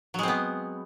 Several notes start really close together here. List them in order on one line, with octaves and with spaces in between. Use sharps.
F#3 G#3 C4 B3